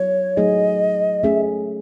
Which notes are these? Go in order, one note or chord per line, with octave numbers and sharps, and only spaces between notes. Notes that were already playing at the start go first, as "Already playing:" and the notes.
Already playing: F#3 B3 E4 C#5
F#3 A3 D#4 G#4 D#5
A3 C#4 G#4 E5